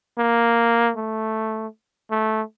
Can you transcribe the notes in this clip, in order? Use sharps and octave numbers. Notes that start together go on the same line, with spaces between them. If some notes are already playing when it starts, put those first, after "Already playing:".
A#3
A3
A3